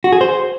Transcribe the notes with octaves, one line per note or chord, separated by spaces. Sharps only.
F#4
G#4
C5